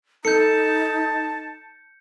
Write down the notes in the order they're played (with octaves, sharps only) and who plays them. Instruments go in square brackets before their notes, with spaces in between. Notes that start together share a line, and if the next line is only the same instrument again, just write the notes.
[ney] D#4 [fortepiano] A4 [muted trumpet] A5 [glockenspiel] G6 C#7